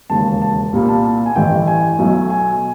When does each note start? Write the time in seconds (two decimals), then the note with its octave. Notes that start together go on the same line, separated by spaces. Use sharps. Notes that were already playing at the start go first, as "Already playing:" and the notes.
0.10 E1 D#2 C#3 A5
0.42 A5
0.73 C2 A#2 G3 A#3
0.89 A5
1.04 A5
1.26 G#5
1.36 A1 G2 E3 A3 G5
1.67 G#5
1.99 B1 B2 F#3 A3
2.30 G#5